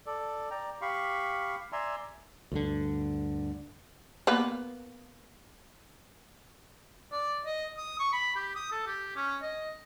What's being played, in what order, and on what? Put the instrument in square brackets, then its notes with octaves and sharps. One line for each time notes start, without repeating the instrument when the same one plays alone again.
[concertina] A4 D5
D5 G5 A#5
G4 F5 B5 C#6
D5 E5 G#5 A#5 C6 E6
[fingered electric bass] D2 G2 D3
[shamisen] A#3 B3 B4
[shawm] D5
D#5
D#6
C#6
B5
G4
D#6
A4
G4
C#4
D#5